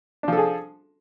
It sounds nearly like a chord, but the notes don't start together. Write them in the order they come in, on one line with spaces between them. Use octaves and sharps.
D4 F3 A4 G#4